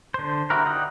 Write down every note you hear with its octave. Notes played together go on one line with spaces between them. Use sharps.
D3 C5
E4 F#4 G4 A#4
D#4 D5 F#5 G5 D#6